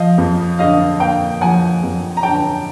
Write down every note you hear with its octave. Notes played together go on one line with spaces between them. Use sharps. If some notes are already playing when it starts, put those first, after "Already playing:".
Already playing: F3 D#5 F5
F2
D3 D#5 F5
A#3 F5 G5
F3 F#5 G#5
F2
A#5
D3 G5 A5